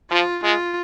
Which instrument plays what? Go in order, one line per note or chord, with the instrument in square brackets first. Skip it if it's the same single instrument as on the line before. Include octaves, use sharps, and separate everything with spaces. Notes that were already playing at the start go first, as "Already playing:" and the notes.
[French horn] F3 [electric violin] F4
[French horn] G#3 [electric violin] F4